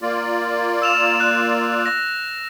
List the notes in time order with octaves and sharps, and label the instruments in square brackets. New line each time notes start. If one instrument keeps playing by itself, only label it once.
[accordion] A#3 F4 D5
[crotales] E6 E7 F7
F#6
A#6